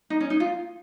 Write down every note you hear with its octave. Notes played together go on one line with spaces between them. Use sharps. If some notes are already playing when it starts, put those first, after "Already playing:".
D#4
C#4
D#4
F4